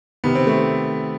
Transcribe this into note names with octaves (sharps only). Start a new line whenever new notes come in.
C3 D#3 B3
C4
A3